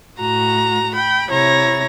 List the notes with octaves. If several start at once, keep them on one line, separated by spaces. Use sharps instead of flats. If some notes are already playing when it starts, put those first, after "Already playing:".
A2 F#4 A#5
G5 B5
C3 E4 C#5 A#5 A#6